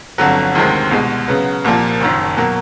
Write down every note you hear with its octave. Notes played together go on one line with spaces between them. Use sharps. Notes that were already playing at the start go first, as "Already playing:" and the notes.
G1 F2 D3 F#3
D2 C3 D#3 G#3 C4
C2 B2 G#3
C#3 F#3 B3
C2 A#2 F3 A#3
F#1 F#2 D#3
B2 F#3 A#3